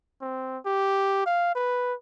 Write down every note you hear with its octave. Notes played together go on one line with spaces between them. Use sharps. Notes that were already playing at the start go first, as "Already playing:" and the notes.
C4
G4
F5
B4